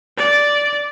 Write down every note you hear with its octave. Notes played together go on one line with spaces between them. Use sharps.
D5